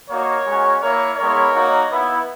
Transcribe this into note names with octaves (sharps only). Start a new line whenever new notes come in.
A#3 D#4 F#4 A#4 C#5
G#3 C#4 F#4
A#3 E4 A#4 C#5
G#3 B3 E4 A#4 C#5
A#3 D#4 F#4
B3 E4